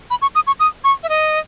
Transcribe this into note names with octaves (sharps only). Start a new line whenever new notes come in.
B5
C#6
D#6
C#6
D#6
C#6
E5
D#5